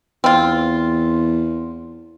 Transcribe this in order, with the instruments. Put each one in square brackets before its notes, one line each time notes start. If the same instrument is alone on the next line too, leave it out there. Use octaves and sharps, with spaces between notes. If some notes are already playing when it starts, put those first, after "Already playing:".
[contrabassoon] E2 [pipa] C4 F4